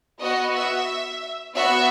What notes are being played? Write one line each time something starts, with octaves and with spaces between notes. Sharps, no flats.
B3 F#4 D#5
E5
B3 F#4 E5